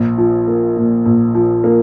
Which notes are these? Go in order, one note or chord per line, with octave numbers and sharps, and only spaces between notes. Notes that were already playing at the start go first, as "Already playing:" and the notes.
Already playing: A#1
F3
A#3
A#2
A#1
F3
A#3